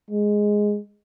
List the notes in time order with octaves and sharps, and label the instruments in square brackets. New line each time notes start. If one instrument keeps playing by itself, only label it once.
[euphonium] G#3